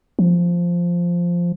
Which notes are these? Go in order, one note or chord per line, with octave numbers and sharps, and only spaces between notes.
F3